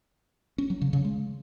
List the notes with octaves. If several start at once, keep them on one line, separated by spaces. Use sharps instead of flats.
C#4
F#3
C#3
C#3
G#3